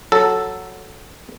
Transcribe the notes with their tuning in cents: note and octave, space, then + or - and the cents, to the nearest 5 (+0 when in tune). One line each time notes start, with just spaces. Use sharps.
F#3 -5 A4 +0